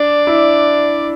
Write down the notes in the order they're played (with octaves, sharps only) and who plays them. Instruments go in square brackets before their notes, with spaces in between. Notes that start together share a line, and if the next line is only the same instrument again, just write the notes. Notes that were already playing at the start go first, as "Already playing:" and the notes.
Already playing: [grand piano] D4 [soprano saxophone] D5
[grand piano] E4